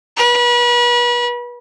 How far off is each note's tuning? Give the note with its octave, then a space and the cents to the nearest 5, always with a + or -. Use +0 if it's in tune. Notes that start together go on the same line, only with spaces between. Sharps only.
B4 -35